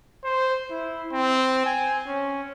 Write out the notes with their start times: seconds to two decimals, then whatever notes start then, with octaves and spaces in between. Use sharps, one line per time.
0.24 C5
0.71 E4
1.13 C4
1.66 G#5
2.07 C#4